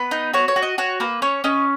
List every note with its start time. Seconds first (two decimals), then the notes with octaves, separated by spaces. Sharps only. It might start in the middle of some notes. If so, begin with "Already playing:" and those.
Already playing: B3 B4
0.11 D#4
0.33 F#4 C#5
0.48 C#5
0.56 F#4
0.62 D#5
0.78 F#4 C#5
1.00 A#3 B4
1.22 C#4 C#5
1.44 C#4 D#5